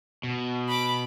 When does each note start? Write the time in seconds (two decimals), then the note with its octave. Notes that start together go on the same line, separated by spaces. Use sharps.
0.23 B2
0.69 B5 D6